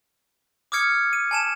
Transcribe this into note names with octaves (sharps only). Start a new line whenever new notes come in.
D6 D#6 F6 G#6 C#7
D#7
G#5 A5 E7